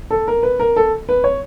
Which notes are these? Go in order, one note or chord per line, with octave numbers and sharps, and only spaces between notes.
A4
A#4
B4
A#4
A4
B4
C#5